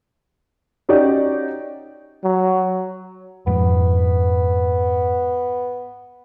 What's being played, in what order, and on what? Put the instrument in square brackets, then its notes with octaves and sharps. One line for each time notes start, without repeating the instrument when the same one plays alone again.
[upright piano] C#4 D#4 F#4 G4 D5 D#5
[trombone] F#3
[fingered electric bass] F2 G#2 [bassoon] B3